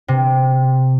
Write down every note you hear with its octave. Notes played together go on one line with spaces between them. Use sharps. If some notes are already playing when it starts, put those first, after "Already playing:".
C3